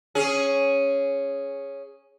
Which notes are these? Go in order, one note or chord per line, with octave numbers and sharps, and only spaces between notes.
C#4 G#4